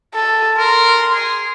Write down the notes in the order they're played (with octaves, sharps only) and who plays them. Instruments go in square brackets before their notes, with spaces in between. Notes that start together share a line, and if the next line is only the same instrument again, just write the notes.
[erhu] A4
[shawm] A#4 [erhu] C6
[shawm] G#4